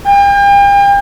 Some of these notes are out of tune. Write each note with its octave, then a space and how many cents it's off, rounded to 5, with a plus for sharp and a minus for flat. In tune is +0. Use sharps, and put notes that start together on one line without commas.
G5 +40